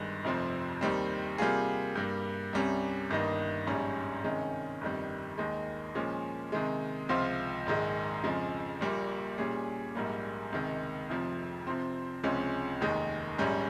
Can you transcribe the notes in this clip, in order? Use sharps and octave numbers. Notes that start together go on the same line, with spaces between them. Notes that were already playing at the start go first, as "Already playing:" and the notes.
Already playing: G1 G2 D#3 G#3
F1 F2 C3 F3 C4
D#2 D#3 G3 C4
C3 G3 A#3 F4 G#4
G2 G3 A#3
C2 C3 G3 C#4
G1 G2 D#3 A#3 D#4
A#1 G#2 G3 C#4
C3 D#3 G#3 C#4
G1 F2 D#3 G3
D#2 D#3 G#3
A#2 F3 G#3 C#4
C3 D#3 G#3
C#2 C3 F3 C4 F4
A#1 G#2 D#3 G#3
F2 C#3 F3 G#3
A#1 A#2 G3 A#3
A#2 G3 C#4 G#4
A#1 G#2 G3 A#3
C#2 C3 D#3 G#3
F1 F2 C3 F3
C3 F3 C4
C#2 C3 F3 G#3 C#4
F1 D#2 D#3 G#3
A#1 G#2 G3 C#4